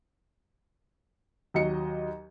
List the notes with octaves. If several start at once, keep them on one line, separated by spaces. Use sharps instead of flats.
D#2 F#3 D#5 C#7